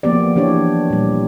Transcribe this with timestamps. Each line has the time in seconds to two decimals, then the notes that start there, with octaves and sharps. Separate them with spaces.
0.03 F3 A#3 B3 G4 D5
0.36 E3 D4 G4 C#5
0.90 A#2 G3